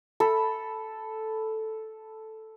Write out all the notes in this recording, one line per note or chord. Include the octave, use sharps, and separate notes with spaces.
A4 B5